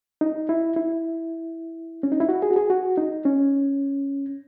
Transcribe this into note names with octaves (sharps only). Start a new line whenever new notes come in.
D#4
E4
E4
C#4
D#4
E4
F#4
G#4
F#4
G#4
F#4
D#4
C#4